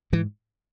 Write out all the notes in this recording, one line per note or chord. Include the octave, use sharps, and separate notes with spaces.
G#2 E3